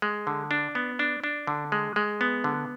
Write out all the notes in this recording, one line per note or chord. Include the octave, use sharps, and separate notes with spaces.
G#3
D3
D4
B3
D4
D4
D3
G#3
G#3
B3
D3